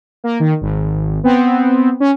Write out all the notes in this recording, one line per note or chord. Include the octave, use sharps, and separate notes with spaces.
A#3
D#3
G#1
B3 C4
C#4